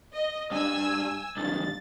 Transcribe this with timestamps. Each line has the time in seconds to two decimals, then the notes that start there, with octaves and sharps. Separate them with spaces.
0.14 D#5
0.51 G2 G#5 E6
1.37 B1 G2 A6